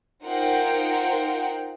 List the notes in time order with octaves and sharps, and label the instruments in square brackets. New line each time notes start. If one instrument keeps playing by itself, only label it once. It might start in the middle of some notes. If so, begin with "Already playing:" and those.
[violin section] D#4 F4 A#4 C5 F#5 G5